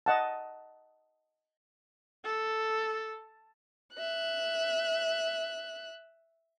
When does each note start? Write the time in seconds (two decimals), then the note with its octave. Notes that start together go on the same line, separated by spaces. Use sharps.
0.06 D#5 F#5 A5
2.24 A4
3.95 E5 F#6